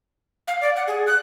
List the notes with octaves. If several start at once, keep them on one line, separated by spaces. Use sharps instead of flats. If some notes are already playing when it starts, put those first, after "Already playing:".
F5
D5
F#5
G#4
F#6